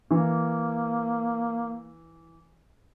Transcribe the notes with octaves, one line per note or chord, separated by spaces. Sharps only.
E3 A#3